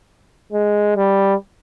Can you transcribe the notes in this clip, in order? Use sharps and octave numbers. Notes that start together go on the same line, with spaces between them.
G#3
G3